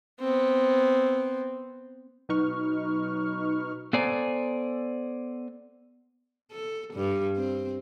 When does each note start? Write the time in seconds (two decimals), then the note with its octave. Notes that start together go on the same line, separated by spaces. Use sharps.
0.20 B3 C4
2.29 B2 F#3 D#4 B4 C#6 F6
3.93 B3 A4 C5 D5 G#5 A#5
6.52 A4
6.94 G2
7.37 C4